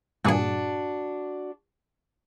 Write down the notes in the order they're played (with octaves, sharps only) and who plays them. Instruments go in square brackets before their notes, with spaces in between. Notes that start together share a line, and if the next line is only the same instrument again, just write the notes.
[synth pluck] G2 A#2 G#4 [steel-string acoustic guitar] D4 F#4